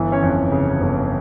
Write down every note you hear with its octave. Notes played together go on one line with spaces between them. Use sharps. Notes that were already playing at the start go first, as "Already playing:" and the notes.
Already playing: G1 E3
C#4 C#5
F2
C#3
G1